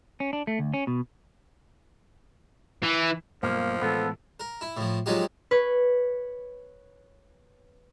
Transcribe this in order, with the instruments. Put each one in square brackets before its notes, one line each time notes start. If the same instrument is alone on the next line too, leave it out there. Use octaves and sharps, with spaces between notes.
[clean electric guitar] C#4
D4
A3
D2
C#4
B2
[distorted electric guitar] E3
[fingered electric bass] G2 B2 F#3 [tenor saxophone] F3 [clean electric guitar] A#3
[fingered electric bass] A2 E3 G#3 [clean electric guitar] B3 [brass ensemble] A4
[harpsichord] A#4
E4
A2 F3
F3 F#3 G#3 D#4 F4 G4
[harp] B4 C#5